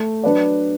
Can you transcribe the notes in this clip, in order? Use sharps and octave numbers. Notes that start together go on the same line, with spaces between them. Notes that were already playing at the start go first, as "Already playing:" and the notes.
Already playing: A3
F#3 D4 B4 D5